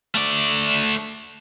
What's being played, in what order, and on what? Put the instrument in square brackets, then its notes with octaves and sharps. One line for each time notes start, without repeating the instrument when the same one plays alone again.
[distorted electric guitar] A3 D5